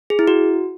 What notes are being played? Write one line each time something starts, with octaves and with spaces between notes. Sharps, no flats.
G#4
E4
F#4